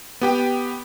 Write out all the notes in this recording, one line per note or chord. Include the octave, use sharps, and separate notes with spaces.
B3 G4 G5